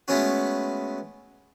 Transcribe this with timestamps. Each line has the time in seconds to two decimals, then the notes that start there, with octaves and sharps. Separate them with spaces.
0.08 G#3 A3 B3 C#4 F#4